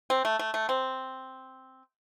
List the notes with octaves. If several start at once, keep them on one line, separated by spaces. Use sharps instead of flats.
C4
A3
A3
A3
C4